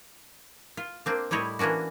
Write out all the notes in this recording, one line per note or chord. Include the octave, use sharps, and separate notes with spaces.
F4
A#3 C4 D4
A2 G3 E4 C#5 D#5
E3 A#3 C#4 D4 F#4